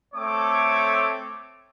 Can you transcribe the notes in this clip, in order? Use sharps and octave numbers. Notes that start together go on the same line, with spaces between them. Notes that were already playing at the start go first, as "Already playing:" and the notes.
A3 C4 A4 C#5 D6